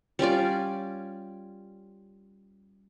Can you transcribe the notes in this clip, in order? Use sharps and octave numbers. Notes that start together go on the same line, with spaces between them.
G3 C#4 F4 D5